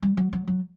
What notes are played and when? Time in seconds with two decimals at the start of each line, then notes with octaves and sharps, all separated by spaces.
0.02 G3
0.17 F#3
0.33 F#3
0.48 F#3